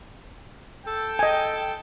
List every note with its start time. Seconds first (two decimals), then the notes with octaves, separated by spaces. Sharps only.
0.85 A4 G5
1.19 D#5 G#5